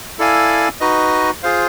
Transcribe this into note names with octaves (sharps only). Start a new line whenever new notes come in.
E4 A4 D5 F5 G#5
D#4 F#4 B4 D#5
F4 G#4 C5 F5